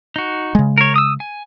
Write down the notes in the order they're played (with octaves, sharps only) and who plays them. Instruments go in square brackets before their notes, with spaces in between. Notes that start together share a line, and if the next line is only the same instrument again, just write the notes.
[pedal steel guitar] D#4 F#4
[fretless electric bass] C#3 G#3
[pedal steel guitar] A#4 C#5
D#6 E6
G#5